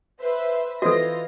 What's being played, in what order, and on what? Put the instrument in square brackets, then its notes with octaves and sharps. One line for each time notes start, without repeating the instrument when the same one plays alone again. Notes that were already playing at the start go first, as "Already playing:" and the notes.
[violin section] B4 C5 E5
[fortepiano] E3 C5 D#5 [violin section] F4 A#6 [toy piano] F#4 A4